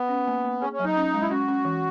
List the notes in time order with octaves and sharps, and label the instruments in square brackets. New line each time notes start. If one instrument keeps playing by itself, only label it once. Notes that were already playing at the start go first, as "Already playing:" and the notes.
Already playing: [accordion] B3
[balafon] C#4
A#3
A#3
[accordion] C#4 [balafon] G#4
[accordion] C#4
[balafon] F#3
[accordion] D#4
[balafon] C#4
G#3
[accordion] E4
[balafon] C#4 [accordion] F#4
[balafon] C#4
E3